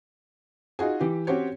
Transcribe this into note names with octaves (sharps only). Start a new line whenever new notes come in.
D#4 F4 F#4 G#4
E3 G4
C4 C#4 F#4 G4 C5 C#5